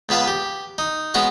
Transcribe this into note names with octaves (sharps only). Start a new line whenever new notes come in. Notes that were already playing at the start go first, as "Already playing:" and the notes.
C#2 B3 B4 F5 A5
G4
D#4
G#3 B3 C#4 F#4 C#6